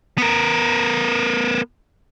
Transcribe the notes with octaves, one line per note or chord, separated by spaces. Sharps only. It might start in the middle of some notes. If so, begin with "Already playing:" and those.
B3 A#4